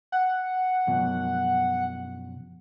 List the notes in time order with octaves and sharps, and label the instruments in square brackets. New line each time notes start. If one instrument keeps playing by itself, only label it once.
[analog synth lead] F#5
[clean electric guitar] F#2 B2 F3